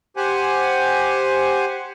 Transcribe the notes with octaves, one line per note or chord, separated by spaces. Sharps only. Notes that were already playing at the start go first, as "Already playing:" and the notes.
G4 C5 F#5 G#5